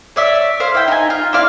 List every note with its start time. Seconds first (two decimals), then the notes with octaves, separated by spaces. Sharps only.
0.16 C#5 D5 E5
0.60 C5 F5
0.75 E4 G5
0.88 D#4 G#5
1.10 F4
1.33 C4 E4 D5 F5